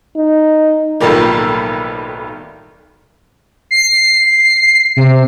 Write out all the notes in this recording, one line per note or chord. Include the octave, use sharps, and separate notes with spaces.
D#4
B1 A2 D#3 F3 G3 A#3
C7
C3